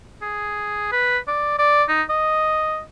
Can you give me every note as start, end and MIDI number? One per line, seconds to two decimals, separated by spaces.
0.22 0.89 68
0.92 1.18 71
1.28 1.57 74
1.59 1.84 74
1.89 2.02 63
2.09 2.81 75